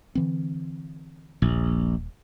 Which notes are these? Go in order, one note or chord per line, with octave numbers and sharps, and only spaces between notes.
D3 E3 C4
D#1 A#1 A#2